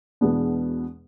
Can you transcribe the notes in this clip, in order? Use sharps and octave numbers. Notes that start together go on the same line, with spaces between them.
E2 B2 G#3 B3 D4